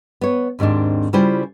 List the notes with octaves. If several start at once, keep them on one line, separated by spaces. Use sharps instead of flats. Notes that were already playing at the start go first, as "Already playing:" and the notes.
B3 C#5
D#2 G#2 D#3 C4 D4
C#3 G3 E4 F4 C5 G#5